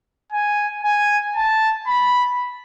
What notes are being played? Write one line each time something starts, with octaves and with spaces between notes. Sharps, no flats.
G#5
G#5
A5
B5